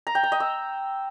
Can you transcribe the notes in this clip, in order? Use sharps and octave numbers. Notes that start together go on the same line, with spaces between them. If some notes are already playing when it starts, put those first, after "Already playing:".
A#5
G5
A#5
D#5
E6